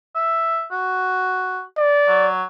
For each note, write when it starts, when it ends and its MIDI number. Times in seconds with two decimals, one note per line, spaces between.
0.15 0.65 76
0.71 1.62 66
1.78 2.28 74
2.08 2.44 54